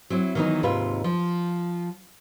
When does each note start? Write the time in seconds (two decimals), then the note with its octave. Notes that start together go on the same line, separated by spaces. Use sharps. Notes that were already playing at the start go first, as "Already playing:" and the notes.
0.10 F#3 C4 E4
0.35 D#3 E3 F#3 A3 B3 D#4
0.63 D#2 G#2 C3 F4 B4
1.04 F3